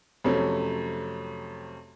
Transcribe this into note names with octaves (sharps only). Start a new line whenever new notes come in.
F2 C3 F#3 A3 C#4